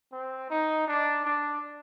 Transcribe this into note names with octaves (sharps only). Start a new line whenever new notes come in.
C4
D#4
D4
D4